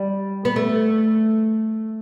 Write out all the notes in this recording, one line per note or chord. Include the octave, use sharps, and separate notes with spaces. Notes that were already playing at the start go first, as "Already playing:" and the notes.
Already playing: G3
B3
A3